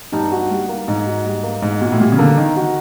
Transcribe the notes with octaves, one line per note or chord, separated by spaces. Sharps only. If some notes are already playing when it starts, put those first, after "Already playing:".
G2 D#4
F#4
G3
A#3
G#2 D#4
F#4
G3
A#3
G#2 D#4
A#2 F#4
A2
A#2 G3
C#3
D3 A#3
D#3 D#4
F#4